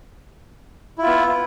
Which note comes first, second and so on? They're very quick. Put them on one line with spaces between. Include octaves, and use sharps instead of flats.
E4 F4 B3